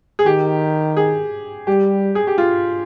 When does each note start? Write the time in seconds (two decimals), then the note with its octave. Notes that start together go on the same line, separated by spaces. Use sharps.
0.19 G#4
0.26 D#3 G4
0.97 G#4
1.67 G3 G4
2.15 G#4
2.27 G4
2.38 F4